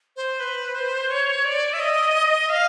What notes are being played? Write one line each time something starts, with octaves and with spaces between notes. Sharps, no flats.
C5
B4
C5
C#5
D5
E5
D#5
F5